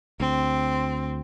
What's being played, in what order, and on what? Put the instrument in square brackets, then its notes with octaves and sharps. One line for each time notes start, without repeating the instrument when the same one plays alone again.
[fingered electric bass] D2 [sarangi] C4